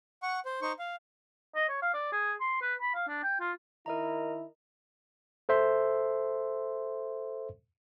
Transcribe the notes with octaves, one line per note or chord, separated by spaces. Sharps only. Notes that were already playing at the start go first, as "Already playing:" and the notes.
F#5 C#6
C5
D#4 C5 C#6
F5
D#5
C#5
F5
D5
G#4
C6
B4
B5
F5
D4
G5
F4
D#3 E4 A#4 D#5 A#5
A4 C5 E5 C6